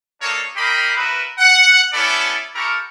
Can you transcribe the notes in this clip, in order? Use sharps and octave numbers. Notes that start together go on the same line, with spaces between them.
A#3 D4 D#4 A4 C#5
G4 A#4 D#5 B5 C6
E4 F#4 A#4 B4
F#5
B3 C#4 E4 A4 D5
E4 G4 A4 A#4 C#6